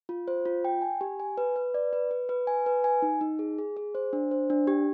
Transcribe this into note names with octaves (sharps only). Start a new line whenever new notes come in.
F4
C5
F4
G5
G#5
G4
G#5
B4
B4
D5
B4
B4
B4
G#5
B4
G#5
D#4
D#4
G#4
G#4
G#4
C5
D4
C5
D4
G4